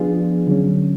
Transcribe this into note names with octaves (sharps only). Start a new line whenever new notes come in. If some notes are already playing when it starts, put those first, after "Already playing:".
Already playing: F3 B3 D4 F4 G#4
D3 F#3 C#4